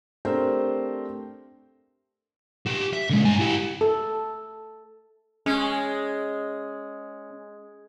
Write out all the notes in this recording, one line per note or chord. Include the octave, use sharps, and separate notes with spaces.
A3 C4 D4 G4 A#4 C5
G4 F#5
E5
D3 G#3
G2 G#5
E4 G4
A4
G#3 C#4